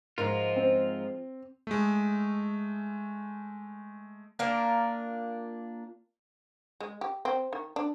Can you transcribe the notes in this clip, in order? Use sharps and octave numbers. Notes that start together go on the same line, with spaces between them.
G#2 F3 G#3 F4 A#4
C4
G#3 A3
A#3 D4 F4 A#4
G#3
G4
C4
D#3
D4